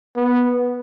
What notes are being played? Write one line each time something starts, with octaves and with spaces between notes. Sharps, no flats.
B3